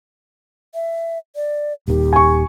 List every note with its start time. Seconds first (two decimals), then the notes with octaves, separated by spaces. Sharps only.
0.74 E5
1.35 D5
1.88 D#1 D#2 D#3 G4
2.13 G#5 C#6